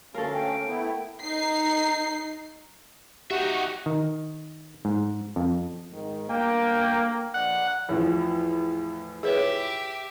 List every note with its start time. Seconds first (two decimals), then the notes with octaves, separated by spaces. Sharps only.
0.14 D2 C#4 A4 A#4 F5
0.34 G5
0.68 A3 B3 E4
1.21 D#4 C7
3.31 D#4 F#4 G4 E5
3.86 D#3
4.85 G#2
5.36 F2
5.92 G#2 D#3
6.29 G1 D2 A#3 G5
7.34 A#1 D5 F#5
7.89 E2 A2 F3
9.23 G4 G#4 B4 C#5 E5